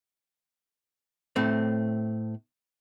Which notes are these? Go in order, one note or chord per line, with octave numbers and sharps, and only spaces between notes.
A2 A3 C4